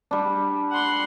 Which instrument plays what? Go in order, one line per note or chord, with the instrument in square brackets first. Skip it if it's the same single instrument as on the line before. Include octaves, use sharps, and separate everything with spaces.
[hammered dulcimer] G3 D4
[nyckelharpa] F#5 C6